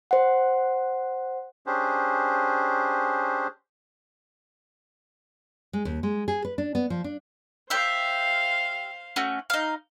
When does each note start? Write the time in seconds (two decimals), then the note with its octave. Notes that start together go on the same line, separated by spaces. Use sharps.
0.11 C5 F#5
1.66 C#4 D4 G4 G#4 C5
5.73 G#3
5.85 D#2
6.03 G#3
6.28 G#4
6.45 B4
6.58 D4
6.75 B3
6.90 F3
7.04 D4
7.70 G4 C5 E5 F5
9.16 A3 C#4 F#4
9.50 D#4 F5